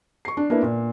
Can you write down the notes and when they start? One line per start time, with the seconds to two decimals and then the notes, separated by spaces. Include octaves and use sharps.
0.25 C#6 C7
0.37 D4
0.50 A#3 B3 D4 E4
0.63 A#2